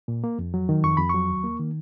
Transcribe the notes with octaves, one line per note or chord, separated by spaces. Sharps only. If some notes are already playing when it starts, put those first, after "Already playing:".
A#2
A#3
F2
F#3
D#3
F2 C#6
F2 B5
F#3 C#6
D#2
A#3
D#3